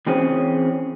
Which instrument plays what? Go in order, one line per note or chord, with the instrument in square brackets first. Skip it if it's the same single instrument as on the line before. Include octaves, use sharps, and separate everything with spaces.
[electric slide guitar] E3 C4 C#4 G#4